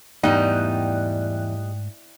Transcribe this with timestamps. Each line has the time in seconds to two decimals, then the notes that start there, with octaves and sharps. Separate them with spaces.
0.23 E2 G#2 G3 A3 D#4 D5 G5 F#6